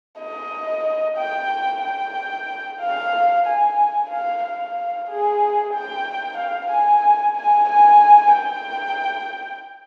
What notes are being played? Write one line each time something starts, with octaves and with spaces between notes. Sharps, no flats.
D#5
G5
G5
F5
G#5
F5
F5
G#4
G5
F5
G#5
G#5
G#5
G5